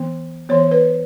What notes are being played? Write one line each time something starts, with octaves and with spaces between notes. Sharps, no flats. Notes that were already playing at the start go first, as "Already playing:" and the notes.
Already playing: E3 B3
E3 B3 C#5
B4